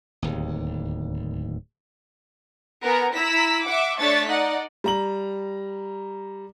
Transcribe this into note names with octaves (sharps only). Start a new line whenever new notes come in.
D1 D#2
B3 A#4 G#5 A#5
E4 A#5 E6 B6
E5 F#5 D6
A3 D4 C#5 C#6 A6 B6
D#4 D5 D#5 F#5
G3 A#5 F#7